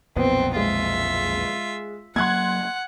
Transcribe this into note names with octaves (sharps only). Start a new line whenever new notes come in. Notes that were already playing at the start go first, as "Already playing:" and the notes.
B1 F2 A#2 B3 C4
G#3 F4 E5
F#3 A#3 F#5 C6 F#6 G#6